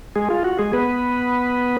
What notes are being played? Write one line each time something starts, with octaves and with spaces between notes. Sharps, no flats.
G#3 G#4
F4
F#4
G#3 G#4
B3 B4